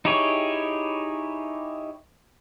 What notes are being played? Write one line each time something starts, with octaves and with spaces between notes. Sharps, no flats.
D#4 E4 G4 G#4 C#5